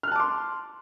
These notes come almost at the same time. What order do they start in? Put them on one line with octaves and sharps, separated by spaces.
F6 F#6 A5 D6 C6